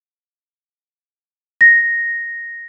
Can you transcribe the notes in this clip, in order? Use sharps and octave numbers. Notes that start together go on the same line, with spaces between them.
A#6